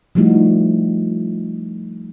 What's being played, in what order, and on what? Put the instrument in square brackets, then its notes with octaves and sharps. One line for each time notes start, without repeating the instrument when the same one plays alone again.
[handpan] F3 G3 A3 D#4 E4 F#4